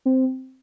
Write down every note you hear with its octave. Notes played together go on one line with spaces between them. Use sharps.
C4